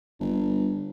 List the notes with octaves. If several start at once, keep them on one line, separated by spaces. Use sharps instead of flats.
G1